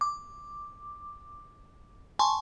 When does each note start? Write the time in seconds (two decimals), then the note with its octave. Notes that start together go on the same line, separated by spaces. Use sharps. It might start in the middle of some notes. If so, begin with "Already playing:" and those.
0.01 D6
2.19 G#5 A5 C6 C#6